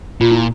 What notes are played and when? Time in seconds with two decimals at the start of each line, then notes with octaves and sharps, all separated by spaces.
0.21 A#2 F4
0.31 E4